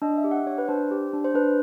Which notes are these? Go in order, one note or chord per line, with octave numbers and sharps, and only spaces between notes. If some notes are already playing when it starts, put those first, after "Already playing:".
D4 D#5
E5
G4
F#5
D4 C#5
B4
D4 C5
G4
D4
C5
D4 B4